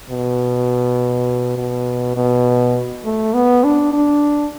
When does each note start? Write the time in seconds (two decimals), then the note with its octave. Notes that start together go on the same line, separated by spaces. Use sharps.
0.10 B2
1.57 B2
2.16 B2
3.04 A3
3.34 B3
3.64 D4
3.93 D4